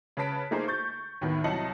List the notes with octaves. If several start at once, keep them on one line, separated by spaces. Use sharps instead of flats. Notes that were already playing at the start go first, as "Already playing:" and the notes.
C#3 B4 A5 B6 D7
A3 A#3 D#4 G#4 C5
C#6 G6 A6
D#2 A2 D#3 B3
C2 F#3 D#5 A5 C#7 F#7